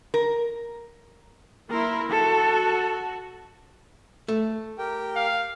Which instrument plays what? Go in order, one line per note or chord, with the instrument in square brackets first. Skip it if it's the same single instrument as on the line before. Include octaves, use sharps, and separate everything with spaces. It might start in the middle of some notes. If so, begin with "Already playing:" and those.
[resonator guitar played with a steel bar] A#4
[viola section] A#3 E4 C6 [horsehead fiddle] A#4
[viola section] F#4 [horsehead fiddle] A4
[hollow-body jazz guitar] A3
[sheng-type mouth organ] G4 A#4 G5
[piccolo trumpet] F5